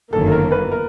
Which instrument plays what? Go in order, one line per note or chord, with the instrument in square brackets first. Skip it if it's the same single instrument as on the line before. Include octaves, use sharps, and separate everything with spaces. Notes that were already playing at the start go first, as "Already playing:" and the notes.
[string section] G1 F#2 D#3 F#3 A#3 [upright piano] A4
[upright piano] A4
A#4
B4
A#4